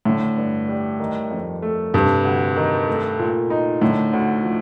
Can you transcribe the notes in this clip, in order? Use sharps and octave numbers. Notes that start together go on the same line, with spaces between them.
A2 D3
G2
G3
D#3
F2
A3
G2 C3
D2
D#3
A3
A#2
D#4
A2 D3
D2
F3